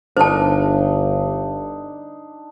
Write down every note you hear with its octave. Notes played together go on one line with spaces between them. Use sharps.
G1 D4 D#4 C5 A5